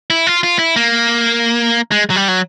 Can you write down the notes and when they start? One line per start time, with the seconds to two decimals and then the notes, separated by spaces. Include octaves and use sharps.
0.10 E4
0.27 F4
0.43 F4
0.59 E4
0.76 A#3
1.91 G#3
2.10 F#3
2.16 G3
2.28 F#3